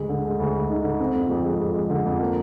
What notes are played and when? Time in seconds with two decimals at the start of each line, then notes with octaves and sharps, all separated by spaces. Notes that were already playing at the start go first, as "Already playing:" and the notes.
Already playing: D2 G#3
0.09 D3
0.25 G#3
0.40 D2
0.54 G#3
0.70 D#4
0.84 D3
0.99 C4
1.15 F2
1.30 F2
1.45 G#3
1.60 F2
1.75 G#3
1.90 D3
2.05 F2
2.20 A#3